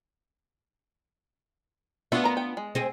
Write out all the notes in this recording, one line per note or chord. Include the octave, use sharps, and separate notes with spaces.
B3 D4 F4 F#4 E5
A#4 A#5
G5
G#3
C4 G#4